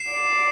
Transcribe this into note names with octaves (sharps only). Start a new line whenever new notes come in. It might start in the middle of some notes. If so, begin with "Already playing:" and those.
Already playing: C7 E7
D5